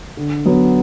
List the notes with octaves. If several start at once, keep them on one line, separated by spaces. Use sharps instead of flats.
D3
F#3 B3